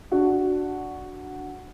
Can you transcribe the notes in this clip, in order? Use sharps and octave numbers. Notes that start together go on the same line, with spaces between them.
D4 F#4